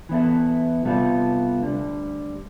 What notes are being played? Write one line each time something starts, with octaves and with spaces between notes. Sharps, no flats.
E3 B3 E4 A4
C3 G3 B3 F4 A4
D2 D3 G3